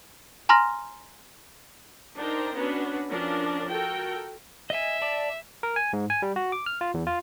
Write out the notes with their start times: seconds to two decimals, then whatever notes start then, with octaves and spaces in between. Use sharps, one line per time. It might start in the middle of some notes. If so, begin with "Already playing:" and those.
0.49 G#5 A#5 C6 F6 A#6
2.17 D4 D#4 A#4 C5 G5 A#5
2.56 B3 C#4 D4 F#4 B4
3.10 F3 C#4 D4 A#4
3.70 F#4 A4 A#4 G5
4.70 D#5 E5 G#5
5.02 D5 A5 D6
5.63 A#4
5.76 G#5
5.93 G#2
6.10 G#5
6.22 G3
6.36 F#4
6.52 D6
6.66 F6
6.81 F4
6.94 E2
7.07 F4